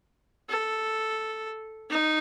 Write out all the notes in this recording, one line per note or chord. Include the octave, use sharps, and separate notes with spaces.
A4
D#4